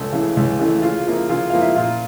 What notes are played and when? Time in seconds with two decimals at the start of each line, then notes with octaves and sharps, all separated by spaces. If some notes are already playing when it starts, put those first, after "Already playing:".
Already playing: C#2 A4
0.12 C#3 E3 A3
0.37 C#2
0.59 C#3 E3 A3
0.82 C#3 F4
1.07 F3 A#3 E4
1.29 C#3 F4
1.50 F3 A#3 E4 F5
1.61 E5
1.76 A#2 F4